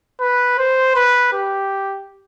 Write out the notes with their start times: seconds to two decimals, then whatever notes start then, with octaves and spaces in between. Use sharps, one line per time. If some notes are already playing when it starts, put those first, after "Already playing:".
0.20 B4
0.58 C5
0.96 B4
1.33 G4